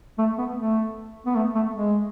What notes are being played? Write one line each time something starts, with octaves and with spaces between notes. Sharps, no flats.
A3
B3
A3
B3
A3
A3
G#3